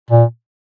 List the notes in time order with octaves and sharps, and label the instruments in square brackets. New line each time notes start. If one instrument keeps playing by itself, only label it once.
[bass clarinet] A#2